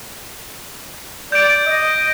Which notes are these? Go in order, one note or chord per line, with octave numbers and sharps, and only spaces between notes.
D5 G6 D7
D#5